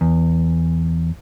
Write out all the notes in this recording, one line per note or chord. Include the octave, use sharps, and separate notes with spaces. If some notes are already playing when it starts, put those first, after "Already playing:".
E2